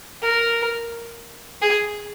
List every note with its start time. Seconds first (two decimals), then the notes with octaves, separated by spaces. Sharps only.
0.22 A#4
1.62 G#4